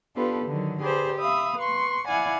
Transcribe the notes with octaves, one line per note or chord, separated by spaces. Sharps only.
B3 D4 F4 G4 A4 B4
D3 D#3 F#3
G4 G#4 B4 C5 D5
E5 F5 B5 D#6
B4 C6 C#6
E4 D5 F5 F#5 G#5